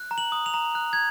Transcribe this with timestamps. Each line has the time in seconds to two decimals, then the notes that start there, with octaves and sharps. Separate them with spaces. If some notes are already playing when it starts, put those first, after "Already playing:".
Already playing: F#6
0.11 A#5
0.18 F#7
0.32 D#6
0.46 F7
0.54 A#5
0.75 F#6
0.93 G#6